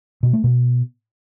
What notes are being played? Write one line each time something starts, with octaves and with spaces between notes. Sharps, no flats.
B2
A3
B2